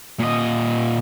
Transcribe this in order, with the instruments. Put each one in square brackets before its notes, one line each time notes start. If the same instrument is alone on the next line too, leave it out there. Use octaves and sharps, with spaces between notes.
[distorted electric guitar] A#2 D#5